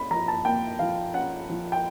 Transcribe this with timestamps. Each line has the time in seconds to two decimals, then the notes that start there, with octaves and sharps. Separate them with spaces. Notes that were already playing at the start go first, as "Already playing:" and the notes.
Already playing: C#4 B5
0.11 F3 A#5
0.28 A5
0.45 A#3 G5
0.79 F3 F5
1.14 C#4 F#5
1.49 F3
1.72 G5